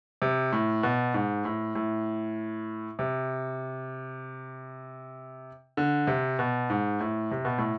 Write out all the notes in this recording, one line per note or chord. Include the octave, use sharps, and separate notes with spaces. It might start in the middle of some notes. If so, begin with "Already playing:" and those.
C3
A2
B2
G#2
A2
A2
C3
D3
C3
B2
G#2
A2
C3
B2
A2